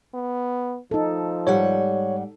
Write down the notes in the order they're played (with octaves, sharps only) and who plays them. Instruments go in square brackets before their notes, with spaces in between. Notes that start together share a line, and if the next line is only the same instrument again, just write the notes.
[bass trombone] B3
[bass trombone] F3 [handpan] D#4 A4
[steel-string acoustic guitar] G#2 G3 F#5 [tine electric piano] C#5